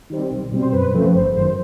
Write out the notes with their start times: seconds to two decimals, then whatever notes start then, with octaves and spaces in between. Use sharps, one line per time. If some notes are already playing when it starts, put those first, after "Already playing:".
0.10 D#3 G3 C4
0.31 B1
0.52 B2 G3 C4
0.62 C5
0.72 F#2 B4
0.94 C#3 F3 A3 C4
1.15 G1 C5
1.36 F#2 D#3 C5